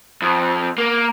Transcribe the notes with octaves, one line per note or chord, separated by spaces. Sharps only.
F2
A#3